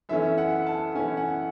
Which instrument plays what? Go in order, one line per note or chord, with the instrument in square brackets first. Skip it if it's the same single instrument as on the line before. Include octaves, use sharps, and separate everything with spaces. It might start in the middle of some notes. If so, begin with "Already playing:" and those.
[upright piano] F#2 E3 A3 C#4 E5
F#5
A5
F#2 E3 A3 C#4 G#5
F#5